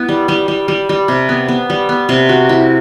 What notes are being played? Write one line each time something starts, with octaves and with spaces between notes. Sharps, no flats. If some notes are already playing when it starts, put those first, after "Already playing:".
Already playing: B3 E4
G3
G3
G3
G3
G3
C3
B3
B3
G3
B3
C3
F#4
E4